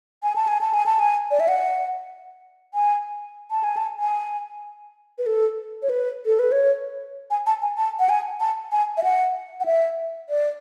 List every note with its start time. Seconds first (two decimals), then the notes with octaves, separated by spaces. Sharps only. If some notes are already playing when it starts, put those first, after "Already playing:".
0.23 G#5
0.36 A5
0.48 G#5
0.61 A5
0.74 G#5
0.86 A5
0.99 G#5
1.31 D5
1.40 E5
1.48 F#5
2.74 G#5
3.51 A5
3.64 G#5
3.77 A5
4.00 G#5
5.18 B4
5.26 A4
5.82 C#5
5.89 B4
6.26 A4
6.39 B4
6.52 C#5
7.31 G#5
7.46 A5
7.62 G#5
7.77 A5
7.99 F#5
8.09 G#5
8.40 A5
8.72 G#5
8.97 E5
9.04 F#5
9.60 F#5
9.66 E5
10.29 D5